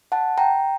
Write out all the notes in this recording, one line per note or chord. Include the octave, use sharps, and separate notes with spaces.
F#5 A5
G5 A#5